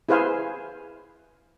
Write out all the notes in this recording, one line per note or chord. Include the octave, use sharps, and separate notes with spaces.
E4 G#4 B4 C5 F5 G#5